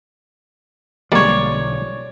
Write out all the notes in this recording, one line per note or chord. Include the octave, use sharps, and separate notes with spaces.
B1 D3 F3 G3 G#3 A#3 C#5 D5